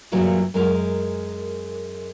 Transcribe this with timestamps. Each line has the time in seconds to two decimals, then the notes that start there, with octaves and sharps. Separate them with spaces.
0.11 F#2 A#2 C#3 E3 F#3 G3
0.54 F#2 G#3 A#4